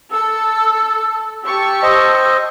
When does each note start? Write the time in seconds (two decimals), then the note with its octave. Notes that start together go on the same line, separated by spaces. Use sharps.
0.12 A4 E6
1.43 G4 A5 C#6 E6
1.83 C5 D#5